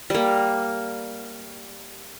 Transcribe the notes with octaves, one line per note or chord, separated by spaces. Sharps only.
G3 A#3